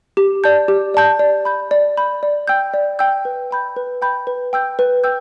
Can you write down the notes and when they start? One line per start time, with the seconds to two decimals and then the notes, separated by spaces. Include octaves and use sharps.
0.17 G4
0.44 D5 A5 G6
0.68 G4
0.94 D5 A5 G6
1.20 D5
1.45 B5 G6
1.71 D5
1.97 B5 G6
2.23 D5
2.48 G5 E6 G6
2.74 D5
2.99 G5 E6 G6
3.25 B4
3.51 G5 B5 G6
3.76 B4
4.02 G5 B5 G6
4.27 B4
4.53 G5 E6 G6
4.79 B4
5.04 G5 E6 G6